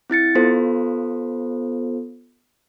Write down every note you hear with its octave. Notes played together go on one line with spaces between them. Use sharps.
C4 E4 A6 C#7
B3 F4 A4 C5